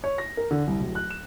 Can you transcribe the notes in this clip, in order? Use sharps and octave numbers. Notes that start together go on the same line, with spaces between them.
C#5
A#6
A#4
D3
C2
D1
F#6
E7